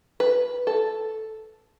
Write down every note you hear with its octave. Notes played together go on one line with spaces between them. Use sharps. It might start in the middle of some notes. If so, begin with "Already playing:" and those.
B4
A4